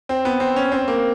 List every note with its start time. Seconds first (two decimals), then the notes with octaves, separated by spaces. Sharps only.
0.09 C4
0.25 B3
0.40 C4
0.56 C#4
0.72 C4
0.88 A#3